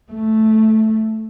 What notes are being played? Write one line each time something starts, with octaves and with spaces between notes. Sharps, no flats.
A3